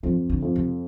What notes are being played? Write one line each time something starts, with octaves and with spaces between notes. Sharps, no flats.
F2 F3
D3
F2
C3